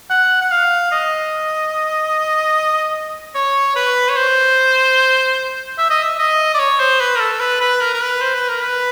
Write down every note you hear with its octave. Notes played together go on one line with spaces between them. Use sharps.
F#5
F#5
F5
D#5
C#5
B4
C#5
C5
E5
D#5
E5
D#5
D5
C#5
C5
B4
A#4
A4
B4
B4
A#4
A#4
B4
C5
B4
A#4
B4